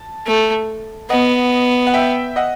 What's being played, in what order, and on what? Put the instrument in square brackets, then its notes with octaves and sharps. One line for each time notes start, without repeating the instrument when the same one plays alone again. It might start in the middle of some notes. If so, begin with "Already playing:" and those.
Already playing: [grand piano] A5
[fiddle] A3
[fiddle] B3 [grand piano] D#5 F#5
[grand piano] F#5
E5 G5
D#5 F#5